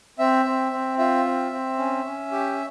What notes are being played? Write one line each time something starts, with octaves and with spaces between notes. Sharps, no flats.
C4 E5
C4
C4
F4 E5
C4
C4
C#4
C#4
G4